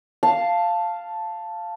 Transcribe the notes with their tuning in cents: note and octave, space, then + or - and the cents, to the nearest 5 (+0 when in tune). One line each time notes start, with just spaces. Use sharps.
F5 -5 A5 +0